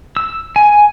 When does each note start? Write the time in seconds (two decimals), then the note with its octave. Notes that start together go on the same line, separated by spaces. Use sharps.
0.17 E6
0.56 G#5